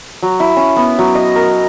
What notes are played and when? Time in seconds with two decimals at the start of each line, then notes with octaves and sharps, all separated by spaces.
0.23 F#3
0.40 E4
0.56 C#4
0.76 B3
0.99 F#3
1.15 D#5
1.35 A#4